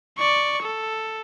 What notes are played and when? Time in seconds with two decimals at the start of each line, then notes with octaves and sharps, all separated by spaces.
0.18 D5 C#6
0.62 A4